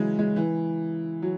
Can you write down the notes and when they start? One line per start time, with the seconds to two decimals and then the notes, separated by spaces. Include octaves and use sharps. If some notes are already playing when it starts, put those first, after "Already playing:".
Already playing: C#3 E3 F#3 G#3
0.19 G#3
0.36 E3
1.22 F#3